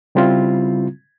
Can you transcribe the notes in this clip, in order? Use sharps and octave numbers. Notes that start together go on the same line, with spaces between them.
C#3 G3 C4 E4 F4